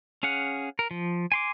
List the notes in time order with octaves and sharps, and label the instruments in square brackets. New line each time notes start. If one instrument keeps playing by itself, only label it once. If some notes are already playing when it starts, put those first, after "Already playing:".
[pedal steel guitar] C#4 G#4 F5 F#5
A#4
F3
G#5 C6 D6